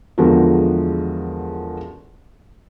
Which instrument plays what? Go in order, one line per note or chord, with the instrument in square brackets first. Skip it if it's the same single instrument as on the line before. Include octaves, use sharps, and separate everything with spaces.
[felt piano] E2 D3 F3 G#3 F#4 A#4